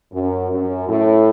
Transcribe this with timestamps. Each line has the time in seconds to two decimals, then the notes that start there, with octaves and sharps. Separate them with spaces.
0.11 F#2
0.50 F#2
0.88 A2